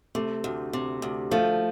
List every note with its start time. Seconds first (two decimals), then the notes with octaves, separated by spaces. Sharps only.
0.15 C3 A3
0.44 D2
0.73 C3
1.02 D2
1.31 F3 A3